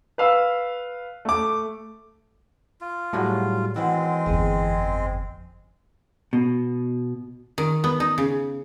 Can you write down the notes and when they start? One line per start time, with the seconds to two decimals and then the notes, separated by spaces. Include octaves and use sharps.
0.18 B4 F5 E6
1.25 A3 D6
2.81 F4
3.13 A2 F#3 G3 F#4 G#4
3.76 D#3 E3 G#3 C4 C#4 F#4
4.26 G1 F2 G#4
6.33 B2
7.58 D#3
7.84 B3
8.00 D#4
8.18 C#3